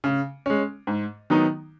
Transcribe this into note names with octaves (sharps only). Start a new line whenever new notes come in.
C#3
G#3 C#4
G#2
D#3 F#3 B3 D#4